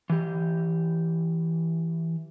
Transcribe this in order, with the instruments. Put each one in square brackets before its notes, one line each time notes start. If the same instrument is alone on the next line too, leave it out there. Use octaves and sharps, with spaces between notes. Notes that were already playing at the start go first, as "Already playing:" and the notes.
[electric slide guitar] E3 G4